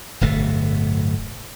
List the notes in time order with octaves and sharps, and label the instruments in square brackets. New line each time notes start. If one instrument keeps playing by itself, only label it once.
[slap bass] D1 G1 B2 A3